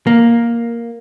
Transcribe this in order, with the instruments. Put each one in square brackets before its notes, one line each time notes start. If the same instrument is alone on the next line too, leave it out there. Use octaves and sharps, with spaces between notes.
[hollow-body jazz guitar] A#3